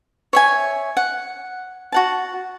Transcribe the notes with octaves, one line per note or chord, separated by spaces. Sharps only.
C#5 E5 G#5
F#5
F#4 F#5 A5